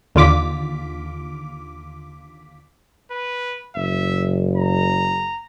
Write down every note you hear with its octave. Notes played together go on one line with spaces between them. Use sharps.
D#2 D3 F4 D6 B6
B4
F#1 E5
A#5